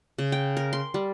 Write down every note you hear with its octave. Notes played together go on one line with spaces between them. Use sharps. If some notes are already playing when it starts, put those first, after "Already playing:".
C#3
G5
A#4
C6
G3